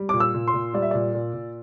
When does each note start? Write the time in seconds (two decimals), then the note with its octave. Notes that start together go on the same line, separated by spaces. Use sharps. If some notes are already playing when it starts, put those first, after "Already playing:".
Already playing: G3
0.09 A#2 D6
0.20 E6
0.34 A#2
0.48 C6
0.54 A#2
0.74 G3 D5
0.82 E5
0.91 A#2 D5
1.14 A#2
1.34 A#2